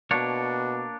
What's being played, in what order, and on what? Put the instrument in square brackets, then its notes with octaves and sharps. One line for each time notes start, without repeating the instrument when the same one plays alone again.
[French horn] B2 [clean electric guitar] A#3 D4 C#5